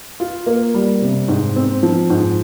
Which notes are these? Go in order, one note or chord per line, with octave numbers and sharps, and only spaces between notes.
F4
A#3
G3
C3
G#2
C4
F3
G#2